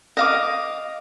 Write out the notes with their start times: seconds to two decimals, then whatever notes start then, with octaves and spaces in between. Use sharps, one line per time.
0.17 D#5 F5 D6